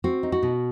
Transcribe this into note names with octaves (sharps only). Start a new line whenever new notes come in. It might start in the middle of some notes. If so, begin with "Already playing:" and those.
C4 F#4
D#4
F#4
B2